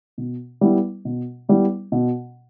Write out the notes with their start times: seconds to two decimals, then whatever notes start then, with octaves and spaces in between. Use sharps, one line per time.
0.18 B2
0.61 G3 B3 E4
1.05 B2
1.49 G3 B3 E4
1.92 B2